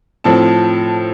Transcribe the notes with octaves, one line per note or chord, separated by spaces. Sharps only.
A2 F3 C4 A5